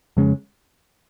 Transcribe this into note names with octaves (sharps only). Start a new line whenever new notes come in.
F2 C#3 G#3 C#4